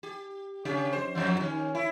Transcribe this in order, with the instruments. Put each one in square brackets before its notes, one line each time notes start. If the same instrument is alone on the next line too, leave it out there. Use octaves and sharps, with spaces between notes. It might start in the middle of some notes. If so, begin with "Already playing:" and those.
[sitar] G4
C#3 C#4 G4
F2 C5
F2 F3 F#3
D#3 C#4
E4